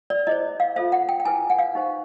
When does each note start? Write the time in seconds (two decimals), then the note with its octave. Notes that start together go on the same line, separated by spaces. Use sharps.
0.10 D5
0.27 E4 G#4 C5 D#5
0.60 F5
0.76 F4 A4 C5 E5
0.92 F#5
1.09 G5
1.20 G5
1.25 E4 G#4 B4 G#5
1.50 F#5
1.59 F5
1.75 D#4 G4 C5